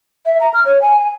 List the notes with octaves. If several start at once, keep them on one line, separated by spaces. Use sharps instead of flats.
E5
A#5
F6
C#5
G#5
G#5